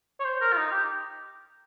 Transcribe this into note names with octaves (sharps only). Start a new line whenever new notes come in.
C#5
C5
A#4
F4
D#4
G4